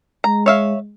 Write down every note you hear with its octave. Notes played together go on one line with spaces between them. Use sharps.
G#3 A#5
C#5 E5 F5